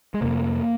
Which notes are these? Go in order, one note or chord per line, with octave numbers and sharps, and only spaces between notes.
G#3
F2 C3 A#3